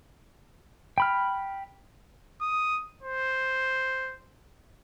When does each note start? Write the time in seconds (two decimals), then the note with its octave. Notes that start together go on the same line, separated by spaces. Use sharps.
0.98 G5 B5 F6
2.41 D#6
3.03 C5